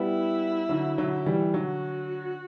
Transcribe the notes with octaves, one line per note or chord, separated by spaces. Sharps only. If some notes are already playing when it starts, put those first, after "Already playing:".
Already playing: G3 B3 E4
D3 F#3
D3 F#3
E3 G3
D3 F#3 F#4